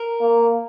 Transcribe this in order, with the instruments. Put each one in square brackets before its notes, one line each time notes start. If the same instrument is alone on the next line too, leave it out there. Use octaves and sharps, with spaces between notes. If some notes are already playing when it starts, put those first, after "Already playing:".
Already playing: [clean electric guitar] A#4
[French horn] A#3